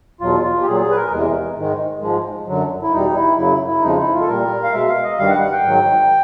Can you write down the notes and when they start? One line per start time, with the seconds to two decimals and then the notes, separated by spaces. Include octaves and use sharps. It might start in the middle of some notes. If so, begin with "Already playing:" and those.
0.21 E2 B2 F#3 F4
0.43 F4
0.61 G4
0.66 A#2 F#3 G#4
0.81 G#4
0.91 B4
0.96 A#4
1.11 E2 C3 E3 G#3
1.56 G#2 D#3 G#3
2.01 G#2 F3 G#3
2.47 F#2 D3 F#3
2.83 E4
2.92 E2 B2 G3 D#4
3.14 E4
3.37 F#2 C#3 F#3 E4
3.68 E4
3.82 F2 C#3 F3 G#3 D#4
3.98 E4
4.13 F4
4.21 A4
4.28 A#2 G3 A#4
4.63 F5
4.73 B2 G#3 E5
4.88 F5
5.03 D#5
5.18 G2 D#3 G3 F5
5.30 F#5
5.41 F#5
5.53 G5
5.64 G#2 D#3 F#3